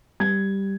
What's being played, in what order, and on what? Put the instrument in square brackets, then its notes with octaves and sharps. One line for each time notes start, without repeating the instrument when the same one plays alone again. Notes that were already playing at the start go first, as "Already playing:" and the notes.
[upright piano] G3 G#6